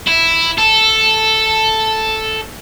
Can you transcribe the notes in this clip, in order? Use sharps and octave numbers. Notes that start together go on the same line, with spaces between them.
E4
A4